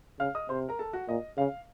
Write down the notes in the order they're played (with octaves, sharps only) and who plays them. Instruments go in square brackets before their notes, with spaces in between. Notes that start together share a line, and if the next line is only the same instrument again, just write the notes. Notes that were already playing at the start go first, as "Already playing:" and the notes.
[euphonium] C#3 [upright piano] F5 F6
[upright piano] D#5 D#6
[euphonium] C3 [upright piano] C5 C6
[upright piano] A#4 A#5
A4 A5
F#4 F#5
[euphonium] A#2 [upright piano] D#5
[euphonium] C#3 [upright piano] F5